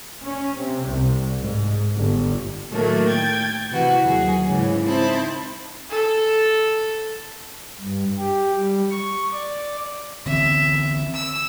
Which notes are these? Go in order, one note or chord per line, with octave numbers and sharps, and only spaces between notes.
C#4
C3
C2
G#2
G1
A2 D#3 F#3 A3 A#3
G5 G#6 A6
C3 E3 E4 F#4 B4
D#2 F#3 F#4 G#4
G#2 C#3 E3 C#4
C4 D#4 E4 C5 A5 B5
A4
G2
G4
G3
C#6
D5
D3 E3 C4 E5
E6